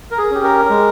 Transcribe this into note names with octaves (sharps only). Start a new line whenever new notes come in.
A#4
G#4
C#4 G4
A#4
G#3